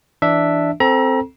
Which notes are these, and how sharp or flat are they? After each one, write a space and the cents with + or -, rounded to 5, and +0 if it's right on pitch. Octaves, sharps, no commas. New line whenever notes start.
E3 +15 D4 +0 E5 +0
C4 +0 A4 +0 A#5 +35